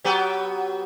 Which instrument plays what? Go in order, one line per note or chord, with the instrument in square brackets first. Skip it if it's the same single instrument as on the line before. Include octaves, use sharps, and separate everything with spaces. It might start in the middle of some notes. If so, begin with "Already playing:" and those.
[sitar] F#3 B3 G4